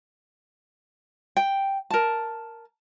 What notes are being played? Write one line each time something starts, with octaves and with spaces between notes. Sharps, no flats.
G5
A#4 A5